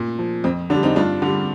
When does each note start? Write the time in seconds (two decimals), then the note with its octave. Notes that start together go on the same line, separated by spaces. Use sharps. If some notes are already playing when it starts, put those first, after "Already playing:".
Already playing: A#2
0.19 F3
0.44 F2 C4
0.70 D3 D4
0.75 G3
0.83 C4 D#4
0.96 G2 D4 F4
1.22 D3 G3